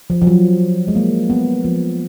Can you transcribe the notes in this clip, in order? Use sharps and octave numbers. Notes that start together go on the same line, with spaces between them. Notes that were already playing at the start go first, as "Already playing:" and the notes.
F3
F3
F#3
G#3
A#3
B3
F3